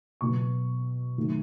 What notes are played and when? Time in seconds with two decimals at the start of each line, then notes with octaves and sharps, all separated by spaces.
0.21 B2 F#3 B3 C#6
1.17 D#3 F#3 A3